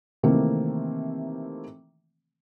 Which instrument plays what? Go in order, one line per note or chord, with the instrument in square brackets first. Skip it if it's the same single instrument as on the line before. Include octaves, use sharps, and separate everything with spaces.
[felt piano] C3 D#3 E3 A3 A#3 C4